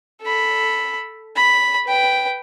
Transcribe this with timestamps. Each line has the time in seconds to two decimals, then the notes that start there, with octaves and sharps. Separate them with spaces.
0.22 A4 B5
1.36 B5
1.86 B4 G5